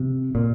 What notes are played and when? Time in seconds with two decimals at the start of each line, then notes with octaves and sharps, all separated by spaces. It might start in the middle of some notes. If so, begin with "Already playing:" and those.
Already playing: C3
0.35 A#2